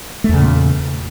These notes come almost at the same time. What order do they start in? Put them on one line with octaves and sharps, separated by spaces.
A3 E2 C#3 A#2